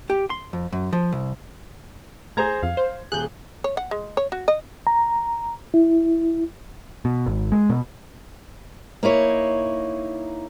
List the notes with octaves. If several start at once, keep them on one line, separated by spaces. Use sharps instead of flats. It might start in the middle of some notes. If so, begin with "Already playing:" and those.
G4
C6
F2
F#2
F3
C2
A2 G#4 C5 A#5 G#6
F2 F5
C5
D#1 G#4 F#6 G6
C#5
F#5
G#3
C#5
F#4
D#5
A#5
E4
B2
G#1
G#3
B2
A#3 D#4 E4 C#5